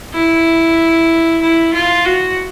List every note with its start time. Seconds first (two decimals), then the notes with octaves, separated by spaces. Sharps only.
0.13 E4
1.41 E4
1.73 F4
2.05 F#4